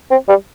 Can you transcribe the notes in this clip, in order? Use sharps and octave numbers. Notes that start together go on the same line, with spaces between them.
C4
G3